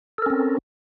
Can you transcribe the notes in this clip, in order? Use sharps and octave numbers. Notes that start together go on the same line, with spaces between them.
C4 C#4 A4 A#4